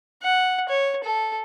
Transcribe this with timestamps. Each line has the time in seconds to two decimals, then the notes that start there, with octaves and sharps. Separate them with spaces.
0.23 F#5
0.69 C#5
1.04 A4